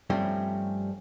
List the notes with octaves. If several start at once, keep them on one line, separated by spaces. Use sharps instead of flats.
G2 F3 G3 A3 C4 C#4